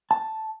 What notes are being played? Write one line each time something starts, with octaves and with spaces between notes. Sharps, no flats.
A5